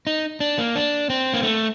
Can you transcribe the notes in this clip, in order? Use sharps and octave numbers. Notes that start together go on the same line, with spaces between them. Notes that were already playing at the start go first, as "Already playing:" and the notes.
D#4
D4
A#3
D4
C4
A#3
A3